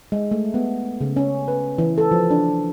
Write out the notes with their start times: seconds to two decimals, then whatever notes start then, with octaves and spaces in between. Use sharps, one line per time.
0.12 G#3
0.31 A3
0.54 B3
1.01 C#3
1.17 C#4
1.48 B4
1.78 E3
1.98 A4
2.11 F3
2.31 D4